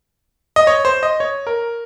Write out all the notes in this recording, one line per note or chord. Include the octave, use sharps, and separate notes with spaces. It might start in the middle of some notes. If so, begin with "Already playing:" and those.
D#5
C#5
C5
D#5
C#5
A#4